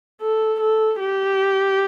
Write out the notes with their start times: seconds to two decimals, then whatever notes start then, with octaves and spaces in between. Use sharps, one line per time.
0.21 A4
0.61 A4
0.99 G4